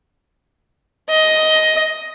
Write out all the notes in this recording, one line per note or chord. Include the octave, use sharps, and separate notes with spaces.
D#5